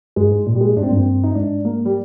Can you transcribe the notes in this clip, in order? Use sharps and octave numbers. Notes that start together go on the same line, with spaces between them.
G2 G#3
G#2
A#2
G3
G#3
G#2 D4
C4
G2 A#3
C4
D#4
G#2 D4
A#3
G3